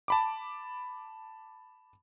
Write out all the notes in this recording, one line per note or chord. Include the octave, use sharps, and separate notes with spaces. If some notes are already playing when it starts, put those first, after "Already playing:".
A5 B5 D6